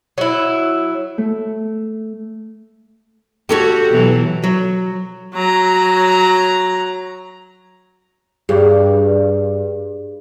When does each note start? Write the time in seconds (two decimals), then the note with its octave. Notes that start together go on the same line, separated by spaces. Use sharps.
0.18 F#3 E4
1.18 A3
3.49 F#4 G4 A4 C#5
3.90 B2 E3 F#3
4.44 F#3
5.34 F#3 A#5
8.49 G2 G4 G#4